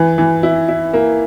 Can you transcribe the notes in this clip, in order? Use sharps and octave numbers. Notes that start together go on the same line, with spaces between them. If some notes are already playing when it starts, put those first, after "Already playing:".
Already playing: E3
E3
E4
E4
A#3